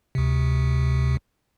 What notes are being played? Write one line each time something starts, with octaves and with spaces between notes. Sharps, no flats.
D2 C3